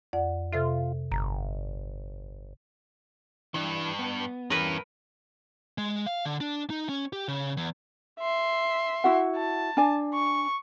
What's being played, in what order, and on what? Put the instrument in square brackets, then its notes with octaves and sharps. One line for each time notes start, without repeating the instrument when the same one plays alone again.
[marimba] F2 D5 F#5
[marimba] C3 A4 E5 [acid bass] F4
[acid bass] G1 [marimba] A#5
[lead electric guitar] G2 [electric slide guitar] E3 D4
[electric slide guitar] B3
[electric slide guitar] E2 E3 C#4 [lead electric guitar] G2 [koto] A#4 B4
[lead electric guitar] G#3
F5
D3
D4
D#4
C#4
G4
C#3
E2
[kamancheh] E5 C6
[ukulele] E4 F#4 F#5
[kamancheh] A5
[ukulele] D4 G#5
[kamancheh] C#6